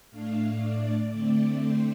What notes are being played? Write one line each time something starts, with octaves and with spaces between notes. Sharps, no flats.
A2 A3 D4 F5
D5
D3 A3 C4
C5